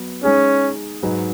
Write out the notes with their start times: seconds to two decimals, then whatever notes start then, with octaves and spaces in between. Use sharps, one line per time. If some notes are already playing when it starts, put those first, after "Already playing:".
Already playing: F#3 B3 B4
0.23 G#3 C#4 D#4 G#4
1.03 G#2 F#3 D#4 G#4 B4